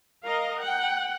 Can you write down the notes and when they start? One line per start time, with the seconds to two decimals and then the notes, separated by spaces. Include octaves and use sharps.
0.24 A#4 D#5 F5
0.60 F#5 G5